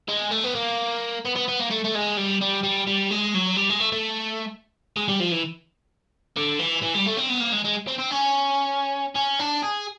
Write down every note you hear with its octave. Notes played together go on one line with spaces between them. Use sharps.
G#3
A3
B3
A#3
B3
B3
B3
A#3
A3
A3
G#3
G3
G3
G3
G3
G#3
F#3
G3
G#3
A3
A3
G#3
G3
F3
E3
D3
E3
E3
G3
A3
C4
B3
A#3
G#3
G#3
C4
C4
C#4
C#4
D4
G#4